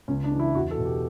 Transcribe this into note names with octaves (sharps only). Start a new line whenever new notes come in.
C#2 C#4
D4
C#3 E3
E4
E2 F#4
A4
B2
G4